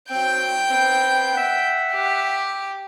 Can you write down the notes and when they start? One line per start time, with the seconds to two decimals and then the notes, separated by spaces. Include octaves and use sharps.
0.11 F#3 C4 G5 G6
0.71 B3 C4
1.34 E5 F#5
1.93 G4